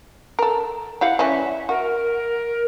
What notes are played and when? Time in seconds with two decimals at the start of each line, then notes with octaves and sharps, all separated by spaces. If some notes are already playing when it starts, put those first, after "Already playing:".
0.39 A4 A#4
1.01 E4 G4 F5 F#5
1.19 E3 G3 C#4 E5
1.69 F#4 A#4